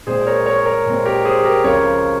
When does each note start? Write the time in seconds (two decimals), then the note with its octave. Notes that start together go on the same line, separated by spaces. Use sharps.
0.07 A#2 G#3 C4 G#4 C5
0.27 A#4 C#5
0.46 A#4 C#5
0.66 A#4 C#5
0.86 A#2 G#3 C4
1.05 G4 A#4
1.25 G#4 C5
1.44 G4 A#4
1.64 C#2 C#3 F3 C4 A#4 C#5